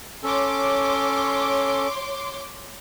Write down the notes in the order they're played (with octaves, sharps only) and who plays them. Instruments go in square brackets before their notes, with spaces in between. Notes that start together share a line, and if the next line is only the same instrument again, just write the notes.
[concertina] C#4 A4 [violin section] C#5 C6 D6